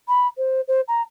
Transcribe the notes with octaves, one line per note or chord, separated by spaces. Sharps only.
B5
C5
C5
A#5